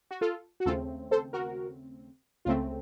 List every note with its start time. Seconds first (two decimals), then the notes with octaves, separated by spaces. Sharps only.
0.11 F#4
0.21 F4 A4
0.60 F#4
0.66 D#2 C#3 A3 C4 F4 A4
1.11 A4 C5
1.33 F#4 A#4
2.45 C#2 C#3 A3 C4 F4